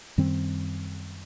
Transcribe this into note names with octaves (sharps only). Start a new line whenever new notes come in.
F#2 D#3 G3 C4